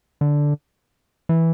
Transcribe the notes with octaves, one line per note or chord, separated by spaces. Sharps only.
D3
E3